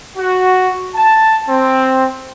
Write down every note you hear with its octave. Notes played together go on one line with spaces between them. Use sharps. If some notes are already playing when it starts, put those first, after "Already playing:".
F#4
A5
C4